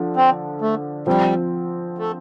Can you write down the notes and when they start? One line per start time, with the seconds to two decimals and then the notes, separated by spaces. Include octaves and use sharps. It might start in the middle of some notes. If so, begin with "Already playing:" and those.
Already playing: D3 F3 D4
0.16 C4
0.61 A3
1.07 F3 G3 C4
1.98 A3